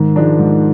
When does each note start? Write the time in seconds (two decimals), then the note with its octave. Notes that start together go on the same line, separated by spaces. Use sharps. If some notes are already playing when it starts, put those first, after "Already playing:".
Already playing: G#2 D#3
0.16 F3 G#3 D4
0.39 G#2